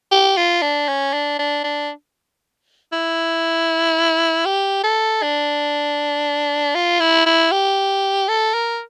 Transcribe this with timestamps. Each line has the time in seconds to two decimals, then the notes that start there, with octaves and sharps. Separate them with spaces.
0.12 G4
0.37 F4
0.62 D4
0.88 C#4
1.13 D4
1.39 D4
1.64 D4
2.92 E4
4.45 G4
4.84 A4
5.22 D4
6.75 F4
7.00 E4
7.26 E4
7.52 G4
8.29 A4
8.54 A#4